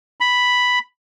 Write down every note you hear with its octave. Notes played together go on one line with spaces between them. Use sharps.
B5